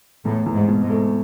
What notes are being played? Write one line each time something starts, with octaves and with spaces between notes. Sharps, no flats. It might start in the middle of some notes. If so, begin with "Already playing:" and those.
E2 A2
E2
G#2
B2
G#2
A3